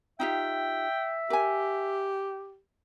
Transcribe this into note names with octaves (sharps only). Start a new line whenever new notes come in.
D#4 F4 G4 E5 G5
G4 A#4 G#5